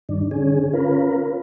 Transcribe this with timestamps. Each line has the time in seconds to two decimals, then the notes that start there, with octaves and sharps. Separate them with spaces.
0.09 G2 D#3 D4
0.31 D3 C#4 G#4
0.73 C#4 F4 A#4 B4